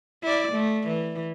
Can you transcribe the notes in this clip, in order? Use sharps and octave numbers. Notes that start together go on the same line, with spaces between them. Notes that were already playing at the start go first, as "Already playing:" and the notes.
E4 D5
A3
E3